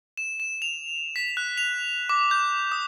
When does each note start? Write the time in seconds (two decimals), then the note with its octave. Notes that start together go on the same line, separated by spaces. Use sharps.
0.17 E7
0.40 E7
0.62 F7
1.16 B6
1.37 F#6
1.58 F7
2.09 D6
2.31 G6
2.72 D#6